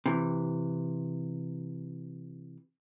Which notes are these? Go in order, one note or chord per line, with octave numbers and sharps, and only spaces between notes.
C3 E3